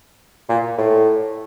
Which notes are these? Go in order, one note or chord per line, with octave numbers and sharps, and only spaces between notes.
A#2
A2